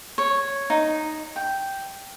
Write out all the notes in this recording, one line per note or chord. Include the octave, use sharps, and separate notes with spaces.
C#5
D#4
G5